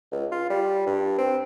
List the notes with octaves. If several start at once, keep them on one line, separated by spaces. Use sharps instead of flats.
C#2
F4
G3
G2
C4